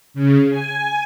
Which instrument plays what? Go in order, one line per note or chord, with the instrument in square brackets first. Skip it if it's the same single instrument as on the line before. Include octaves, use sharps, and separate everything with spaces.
[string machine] C#3
G#5